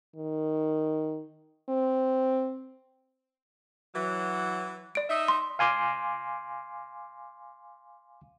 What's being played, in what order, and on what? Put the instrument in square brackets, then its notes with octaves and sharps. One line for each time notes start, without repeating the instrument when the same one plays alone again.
[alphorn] D#3
C4
[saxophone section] E3 F#3
[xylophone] D5 D7
[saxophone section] D#4 D#5 E5
[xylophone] C6
[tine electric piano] F5 G#5 C6 D6